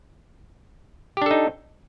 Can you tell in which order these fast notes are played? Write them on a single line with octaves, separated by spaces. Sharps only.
G4 D4 A4 D#4